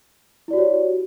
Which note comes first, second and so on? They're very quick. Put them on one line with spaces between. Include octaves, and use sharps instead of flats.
E4 D5 F#4 G4 C#5